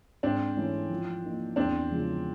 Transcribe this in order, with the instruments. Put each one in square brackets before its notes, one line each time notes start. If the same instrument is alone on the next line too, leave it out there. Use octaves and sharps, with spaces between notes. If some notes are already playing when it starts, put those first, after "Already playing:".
[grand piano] G#2 [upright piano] C4 D4
[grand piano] E3 A3 C#4 E4
F3
A#3 D#4
[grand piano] E2 [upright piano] C4 D4
[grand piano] C#3 F3 G#3 C#4